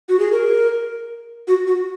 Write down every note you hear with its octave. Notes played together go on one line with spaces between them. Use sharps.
F#4
G#4
A#4
F#4
F#4